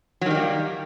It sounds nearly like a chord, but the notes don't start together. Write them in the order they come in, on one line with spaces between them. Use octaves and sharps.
F#3 D#3 G3 A#3